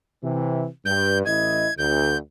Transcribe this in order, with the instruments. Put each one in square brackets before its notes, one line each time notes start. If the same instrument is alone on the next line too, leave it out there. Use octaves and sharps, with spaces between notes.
[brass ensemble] C3 E3
[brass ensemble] G2 [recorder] G6
[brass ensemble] A1 E4 D#5 [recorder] G#6
[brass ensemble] D2 [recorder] G6